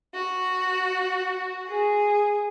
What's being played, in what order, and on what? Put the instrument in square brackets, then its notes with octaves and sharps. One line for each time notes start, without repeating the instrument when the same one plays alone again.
[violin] F#4
G#4